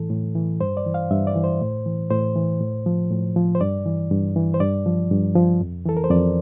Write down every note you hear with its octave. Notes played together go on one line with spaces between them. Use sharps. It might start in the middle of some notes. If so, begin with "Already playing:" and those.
Already playing: A2 E3 A4
A2
E3
G2 C5
D5
E3
F5
G2 E5
D5
E3
C5
A2
E3
A2 C5
E3
A2
F3
A2
F3
C5
G2 D5
E3
G2
E3
C5
G2 D5
F3
G2
F3
F2
E3 A4
A#4
C5
F2 D5